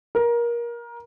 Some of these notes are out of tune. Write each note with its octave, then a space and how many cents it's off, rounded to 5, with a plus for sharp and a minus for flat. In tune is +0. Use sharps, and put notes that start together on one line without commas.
A#4 +25